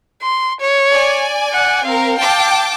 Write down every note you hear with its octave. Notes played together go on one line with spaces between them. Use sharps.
C6
C#5
D5 G#5
F#5
C4 A#4 F5
G5 A5 D6